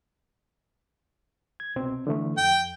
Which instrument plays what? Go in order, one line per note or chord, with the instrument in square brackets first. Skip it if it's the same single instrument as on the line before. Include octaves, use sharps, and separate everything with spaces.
[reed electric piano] G#6
C2 B2 C4
D3 E3 A3
[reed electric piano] F2 [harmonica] G5